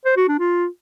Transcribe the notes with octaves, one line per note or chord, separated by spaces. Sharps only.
C5
F#4
D4
F4